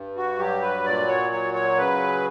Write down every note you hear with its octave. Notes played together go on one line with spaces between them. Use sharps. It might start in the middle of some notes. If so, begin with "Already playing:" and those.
Already playing: G2
F#4
F#3 G4
B4
A#2 D5
C#5
F#3 C#5
C#5
C#3 B4